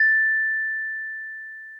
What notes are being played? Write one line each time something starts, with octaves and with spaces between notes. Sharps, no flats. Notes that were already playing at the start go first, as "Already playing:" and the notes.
Already playing: A6